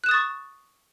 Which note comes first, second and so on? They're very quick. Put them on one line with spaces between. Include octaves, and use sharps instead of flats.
F#6 E7 D#6 A6 C#6